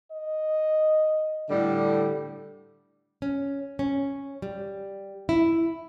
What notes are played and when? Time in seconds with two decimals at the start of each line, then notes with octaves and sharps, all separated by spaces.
0.11 D#5
1.49 A2 D3 G3
3.22 C#4
3.79 C#4
4.42 G3
5.29 E4